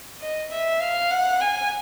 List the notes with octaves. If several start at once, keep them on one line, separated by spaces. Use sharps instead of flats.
D#5
E5
F5
F#5
G#5